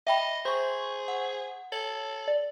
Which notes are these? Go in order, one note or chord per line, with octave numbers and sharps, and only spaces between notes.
D#5 E5 G5 B5
G#4 C5 C6 C#6
F#5
A4 C#5 F#7
D5